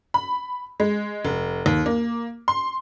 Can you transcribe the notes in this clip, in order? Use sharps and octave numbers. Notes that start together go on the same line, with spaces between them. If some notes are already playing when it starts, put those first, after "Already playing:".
B5
G#3
F1
D#2
A#3
C6